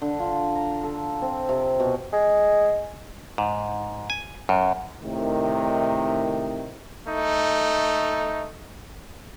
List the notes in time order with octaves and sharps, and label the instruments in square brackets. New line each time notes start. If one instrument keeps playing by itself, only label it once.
[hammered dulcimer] D3
F4
A#5
A4
C4
C3
B2
[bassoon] G#3
[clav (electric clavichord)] G#2
G#5
F#2
[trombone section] A2 C3 D#3
[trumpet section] A3 D#4